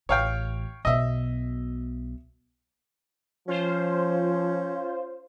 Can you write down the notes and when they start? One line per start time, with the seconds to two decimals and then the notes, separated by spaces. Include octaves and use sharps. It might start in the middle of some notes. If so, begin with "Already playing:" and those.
0.09 A1 C#5 F5 G5
0.85 B1 B2 D#5 E5
3.48 F3 C#4 F4 C5